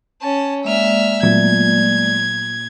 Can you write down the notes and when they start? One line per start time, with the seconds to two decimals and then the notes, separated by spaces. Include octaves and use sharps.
0.22 C#4 A5
0.65 G#3 A#3 D5 E5 F6
1.23 A#2 F#3 A3 B3 G#6